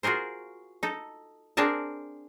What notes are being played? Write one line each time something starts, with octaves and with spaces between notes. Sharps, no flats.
F4 F#4 G#4 A#4 C5
D#4 A4
C4 D4 G#4 A#4 A5